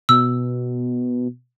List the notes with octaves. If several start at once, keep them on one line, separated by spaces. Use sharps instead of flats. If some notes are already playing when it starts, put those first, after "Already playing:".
B2 E6